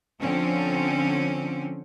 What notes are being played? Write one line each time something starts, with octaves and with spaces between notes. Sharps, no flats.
D3 F3 C4 C#4